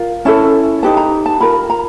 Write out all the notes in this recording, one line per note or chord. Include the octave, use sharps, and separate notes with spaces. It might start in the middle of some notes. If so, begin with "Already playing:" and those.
Already playing: F4 A#4
C#4 E4 A4 A5
D#4 G4 B4 A5
A#5
A5
F4 A#4 B5
A#5